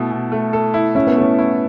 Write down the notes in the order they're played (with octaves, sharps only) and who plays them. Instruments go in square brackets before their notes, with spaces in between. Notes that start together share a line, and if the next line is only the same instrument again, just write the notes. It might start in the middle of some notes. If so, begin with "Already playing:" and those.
Already playing: [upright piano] B2 A3 E4 A4
B2
A3
A4
E4
[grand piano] C#4 [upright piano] E4
[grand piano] B3
[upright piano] A3 [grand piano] C#4
[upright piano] E4